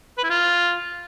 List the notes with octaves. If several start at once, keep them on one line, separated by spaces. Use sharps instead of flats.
B4
E4
F4